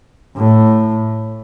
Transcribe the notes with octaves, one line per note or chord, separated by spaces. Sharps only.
A2